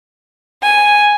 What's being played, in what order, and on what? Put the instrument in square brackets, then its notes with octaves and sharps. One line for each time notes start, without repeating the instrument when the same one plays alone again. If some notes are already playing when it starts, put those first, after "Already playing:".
[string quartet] G#5